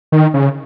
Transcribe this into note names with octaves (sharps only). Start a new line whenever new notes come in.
D#3
C#3